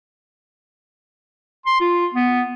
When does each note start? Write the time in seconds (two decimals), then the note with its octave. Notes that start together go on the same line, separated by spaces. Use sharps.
1.66 C6
1.80 F4
2.14 B3